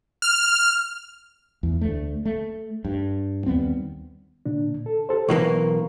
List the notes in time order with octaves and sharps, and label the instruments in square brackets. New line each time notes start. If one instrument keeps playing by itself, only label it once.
[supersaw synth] F6
[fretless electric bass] E2
D2 A3
A3
G2
D#2 G3 B3 C4
[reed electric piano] A#2 D3 D4
A4
G4 A4 C5
[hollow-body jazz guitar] B1 E3 A#3 [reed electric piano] C#6